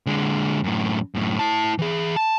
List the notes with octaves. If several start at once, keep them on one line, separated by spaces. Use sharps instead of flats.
D3 G#3
F#2 A2
F#2 A2
E4 A5
E3 G#4
A5